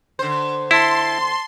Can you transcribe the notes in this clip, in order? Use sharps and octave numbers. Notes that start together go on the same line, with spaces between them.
D3 C5
E4 A5 C6